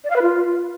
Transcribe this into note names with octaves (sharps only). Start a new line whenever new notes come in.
D5
F5
B4
F4